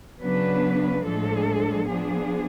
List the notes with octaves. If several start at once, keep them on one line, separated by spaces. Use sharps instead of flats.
C#3 F#3 B3 D4 B4
A2 F3 G#3 D4 A4
F3 B3 D4 G#4